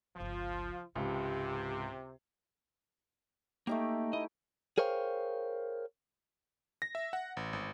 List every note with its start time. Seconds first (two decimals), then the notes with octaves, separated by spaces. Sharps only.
0.16 G1 C#2 F3 F4
0.96 C#2 G#2 C3 G4
3.67 A3 A#3 D#4 G4
4.13 E4 D#5
4.78 G#4 A#4 C5 C#5 F5 G5
6.82 A#6
6.95 E5
7.13 F#5
7.37 A1
7.53 G#1